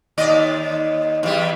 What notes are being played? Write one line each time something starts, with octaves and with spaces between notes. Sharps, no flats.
D#2 D5 D#5
E2 G3